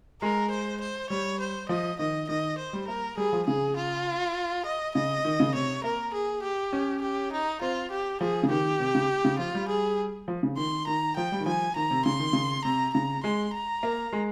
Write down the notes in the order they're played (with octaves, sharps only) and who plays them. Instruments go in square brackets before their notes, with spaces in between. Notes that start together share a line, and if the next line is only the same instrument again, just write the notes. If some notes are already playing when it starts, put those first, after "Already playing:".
[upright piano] G#3 [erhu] A#4
[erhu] C5
C5
[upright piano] G3 [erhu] C#5
[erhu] C5
[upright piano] F3 [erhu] D#5
[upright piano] D#3 [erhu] D#5
[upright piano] D#3 [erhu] D#5
[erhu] C5
[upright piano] G3
[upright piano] A#3 [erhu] A#4
[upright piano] G3 [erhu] G#4
[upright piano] F3
[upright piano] C#3 [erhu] G#4
[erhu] F4
D#5
[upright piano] C#3 [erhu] D#5
[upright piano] D#3
C#3
[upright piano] C3 [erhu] C#5
[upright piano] A#3 [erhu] A#4
[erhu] G#4
G4
[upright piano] C#4
[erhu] G4
D#4
[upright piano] C4 [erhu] F4
[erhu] G4
[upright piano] F3 [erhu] G#4
[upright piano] C#3
[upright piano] D#3 [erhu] G4
[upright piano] C3
C#3
C#3
[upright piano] F3 [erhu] F4
[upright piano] G3
[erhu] G#4
[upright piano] F3
C#3
[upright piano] D#3 [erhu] C6
[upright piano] D#3 [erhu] A#5
[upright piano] F3 [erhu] G5
[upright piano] G3
D#3
[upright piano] F3 [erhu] G#5
[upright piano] D#3 [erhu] A#5
[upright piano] C3
[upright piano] C#3 [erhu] C6
[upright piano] D#3
C#3
[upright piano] C3 [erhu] A#5
[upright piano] C#3 [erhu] A#5
[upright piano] G#3 [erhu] C6
[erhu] A#5
[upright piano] A#3
G#3